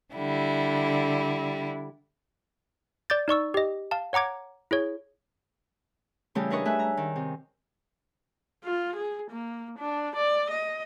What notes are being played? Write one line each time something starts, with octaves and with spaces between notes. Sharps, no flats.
D3 G3 E4
D5 D6 G6 A6
D#4 D5 C#6 E6
G4 D#5
F5 A5
C#5 F#5 A#5 D6 G#6
E4 G#4 C#5
C#3 E3 G3 A3 C#4 G4
D4 A#4 B4 C#5 D#5 C#6
A3 E5 G#5 F#6
A#5
D#3
C3
F4
G#4
A#3
D4
D5
D#5